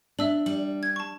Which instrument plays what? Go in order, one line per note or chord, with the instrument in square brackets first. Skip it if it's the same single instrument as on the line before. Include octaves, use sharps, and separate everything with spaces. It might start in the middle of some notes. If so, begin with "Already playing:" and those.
[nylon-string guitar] D4 [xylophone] E5 E6 F#7
[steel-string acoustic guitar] G3 [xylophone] F#7
[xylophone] G#6
A5 C#6